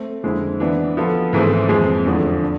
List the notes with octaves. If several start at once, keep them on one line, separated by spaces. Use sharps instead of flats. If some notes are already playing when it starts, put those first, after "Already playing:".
Already playing: A3 C4
F2 D3 G#3 C4 E4
E3 B3 D4
F3 B3 F4 A4
G#2 E3 A3 C4 G#4
F2 E3 G#3 C4 G#4
E2 D3 F3 A3 E4
D4